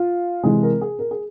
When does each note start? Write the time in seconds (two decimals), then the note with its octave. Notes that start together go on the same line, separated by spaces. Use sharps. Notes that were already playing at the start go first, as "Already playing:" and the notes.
Already playing: F4
0.43 C3 E3 G#3 C4 G#4
0.63 A#4
0.81 G#4
0.99 A#4
1.11 G#4